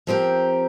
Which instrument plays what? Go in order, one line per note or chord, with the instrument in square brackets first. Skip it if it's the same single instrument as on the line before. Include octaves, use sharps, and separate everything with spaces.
[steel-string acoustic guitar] F3 C4 G4 A#4